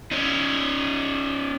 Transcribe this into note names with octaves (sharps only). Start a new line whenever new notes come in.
C#4 D#4